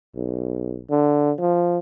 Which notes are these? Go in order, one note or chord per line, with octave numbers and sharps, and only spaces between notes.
B1
D3
F3